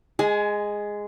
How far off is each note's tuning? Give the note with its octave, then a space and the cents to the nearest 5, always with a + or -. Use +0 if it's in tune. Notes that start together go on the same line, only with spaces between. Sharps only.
G#3 -5 G#5 +25